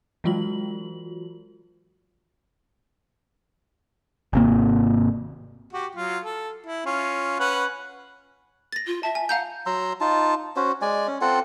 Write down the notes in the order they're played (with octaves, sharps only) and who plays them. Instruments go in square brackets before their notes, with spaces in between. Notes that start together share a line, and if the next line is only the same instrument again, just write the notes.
[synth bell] E3 F#3 G#3 F4 F#4 F#7
[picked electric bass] G#1 C3 A#3
[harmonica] F#4 G4
F#3 F4
A4
E4
C#4 F4
C#4 B4 F#5
[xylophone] A6 A#6
[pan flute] F4
[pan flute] E5 [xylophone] A5
[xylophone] G#5
[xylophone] F5 A#5 G6 [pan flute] F#5
[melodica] F#3 A#5 C6 E6
D#4 F4 A5
C#4 F#4 C5
G#3 D5 G#5
C#4
C4 F4 A4 F#5